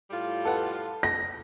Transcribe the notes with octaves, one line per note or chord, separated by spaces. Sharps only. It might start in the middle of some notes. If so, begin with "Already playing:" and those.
A2 G3 F4
A4 B4 F#5
A#6